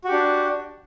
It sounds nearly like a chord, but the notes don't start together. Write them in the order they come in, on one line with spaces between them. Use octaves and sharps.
F#4 G4 D4